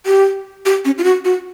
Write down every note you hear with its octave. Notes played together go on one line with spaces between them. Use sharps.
G4
G4
C#4
F4
F#4
F#4